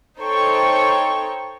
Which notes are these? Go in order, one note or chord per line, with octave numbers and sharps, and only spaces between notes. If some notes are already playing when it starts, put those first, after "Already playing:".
D#4 A4 C5 C#5 G5 C#6